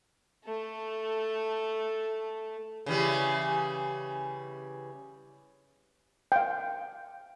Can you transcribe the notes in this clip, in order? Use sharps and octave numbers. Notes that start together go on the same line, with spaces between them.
A3 A4
C#3 E3 G3
F5 G5